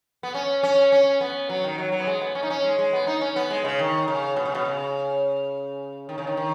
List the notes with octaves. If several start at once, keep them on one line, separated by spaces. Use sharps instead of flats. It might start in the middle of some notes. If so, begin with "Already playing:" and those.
B3
C#4
C#4
C#4
B3
F#3
D#3
F#3
F#3
B3
G#3
B3
C#4
D#4
C#4
G#3
G#3
B3
D#4
C#4
B3
G#3
C#3
D#3
C#3
B2
C#3
B2
C#3
D#3
C#3
D#3
D#3